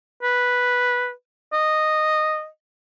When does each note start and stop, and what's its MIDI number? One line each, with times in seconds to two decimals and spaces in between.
0.23 1.11 71
1.53 2.48 75